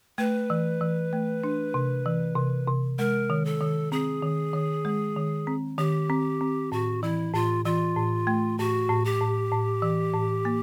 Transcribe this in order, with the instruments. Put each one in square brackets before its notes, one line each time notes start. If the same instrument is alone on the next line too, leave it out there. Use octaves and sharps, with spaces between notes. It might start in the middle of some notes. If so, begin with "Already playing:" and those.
[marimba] A3 [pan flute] B4
[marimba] E3
E3
A3
D4
C3
E3
C3
C3
[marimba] G#3 [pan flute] A#4
[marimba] D#3
[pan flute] A4
[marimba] D#3
[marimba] C4 [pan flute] G#4
[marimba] D#3
D#3
G#3
D#3
C4
[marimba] D#3 [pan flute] G4
[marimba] C4
C4
[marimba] A2 [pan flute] F#4
[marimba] E3 [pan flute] E4
[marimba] A2 [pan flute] F4
[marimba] E3 [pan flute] F4
[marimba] A2
A3
[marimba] A2 [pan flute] F#4
[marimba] A2
[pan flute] G4
[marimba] A2
A2
E3
A2
A#3